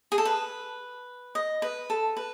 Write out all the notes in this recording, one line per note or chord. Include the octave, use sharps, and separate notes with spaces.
G#4
A4
B4
D#5
B4
A4
B4